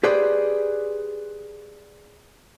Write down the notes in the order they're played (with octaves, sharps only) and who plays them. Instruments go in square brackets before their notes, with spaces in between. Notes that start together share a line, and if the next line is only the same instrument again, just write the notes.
[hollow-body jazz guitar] G4 G#4 B4 C5 D5